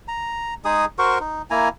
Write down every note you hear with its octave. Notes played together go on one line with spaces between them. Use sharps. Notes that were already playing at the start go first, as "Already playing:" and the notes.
A#5
G#3 D#4 G#4 D#6
F#4 A#4 C5 C#6
D#4
A#3 E4 G#5 A#5